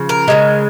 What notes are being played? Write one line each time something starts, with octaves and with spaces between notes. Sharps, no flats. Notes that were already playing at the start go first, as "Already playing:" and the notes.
Already playing: C#3 F3
A#4
C#3 F3 G#3